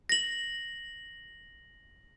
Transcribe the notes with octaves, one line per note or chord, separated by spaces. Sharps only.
A#6 F#7